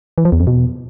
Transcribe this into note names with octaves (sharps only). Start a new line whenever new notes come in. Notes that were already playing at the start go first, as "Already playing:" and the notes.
E3
F3
E2
F2
B2